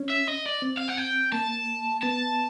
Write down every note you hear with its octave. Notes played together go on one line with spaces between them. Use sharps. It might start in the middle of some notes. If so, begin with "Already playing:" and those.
Already playing: C#4
E5
D#5
D5
C4
F5
F#5
G5
A#3 A5
B3 A5